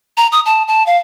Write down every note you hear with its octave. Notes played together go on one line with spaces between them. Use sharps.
A#5
D#6
A5
A5
F5